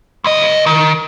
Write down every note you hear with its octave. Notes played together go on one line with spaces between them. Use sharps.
C#2 D#5
D#3